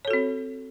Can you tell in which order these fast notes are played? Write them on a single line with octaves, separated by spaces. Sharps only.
C#5 A4 F#4 C4